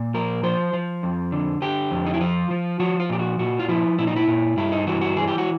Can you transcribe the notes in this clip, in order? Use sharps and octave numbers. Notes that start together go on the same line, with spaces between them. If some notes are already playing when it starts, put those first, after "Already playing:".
Already playing: A#2
F3 A#4
F3 C5
F3
F2
D3
D3 G4
F2
D#4
E4
F3 F4
F3
F3 F#4
F4
A#2 G4
F#4
A#2 F#4
F4
F3 E4
A#2 E4
D#4
E4
A#2
G2 E4
D#4
E3 F#4
F#4
E3 G#4
G4
F#4